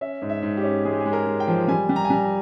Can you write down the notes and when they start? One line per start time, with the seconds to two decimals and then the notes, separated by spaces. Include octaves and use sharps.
0.01 C#4 E5
0.22 G#2
0.29 E5
0.43 G#2
0.57 G4
0.64 C#4
0.85 G#3 G#4
0.93 G4
1.00 G#4
1.06 G#3
1.13 A#4
1.26 G#3
1.40 G5
1.48 F3
1.68 G3 G#5
1.89 G3
1.96 A#5
2.05 G#5
2.10 G3 A#5
2.24 A#5